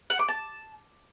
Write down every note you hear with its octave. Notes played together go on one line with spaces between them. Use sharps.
F#5
D6
A5